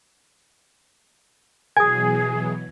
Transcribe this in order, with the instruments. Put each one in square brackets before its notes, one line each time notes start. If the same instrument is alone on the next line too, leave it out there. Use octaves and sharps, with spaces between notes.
[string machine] B2 E3 F#3 [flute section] G#4 [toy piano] G#5 D#6 [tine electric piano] G#6